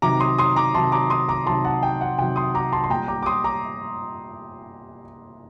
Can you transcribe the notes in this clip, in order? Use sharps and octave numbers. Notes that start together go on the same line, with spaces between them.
C3 D#3 F#3 A#5 D6
C6 D#6
C6 D#6
A#5 D6
C3 D#3 F#3 A5 C6
A#5 D6
C6 D#6
A#5 D6
C3 D#3 F#3 A5 C6
F#5 A5
G5
F#5
C3 D#3 F#3 G5
C6 D#6
A#5 D6
A5 C6
C6
A#2 G3 G5 A#5
A#5 D6
D6
C6 D#6
A#5 D6